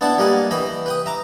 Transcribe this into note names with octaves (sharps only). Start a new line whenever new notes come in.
B3 D4 E4 D5 F#5 A5
G3 A#3 D#5 F#5 G#5
E3 D#5 G5 B5
B4 G5 D#6
E5 A#5 D6